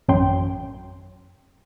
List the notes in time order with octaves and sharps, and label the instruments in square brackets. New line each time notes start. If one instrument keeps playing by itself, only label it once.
[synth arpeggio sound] A1 F#2 F#3 G5 C6